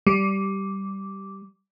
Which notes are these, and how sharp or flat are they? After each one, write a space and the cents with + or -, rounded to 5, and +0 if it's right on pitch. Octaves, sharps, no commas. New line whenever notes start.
G3 -10